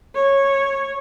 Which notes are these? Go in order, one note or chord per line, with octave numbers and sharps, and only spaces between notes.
C#5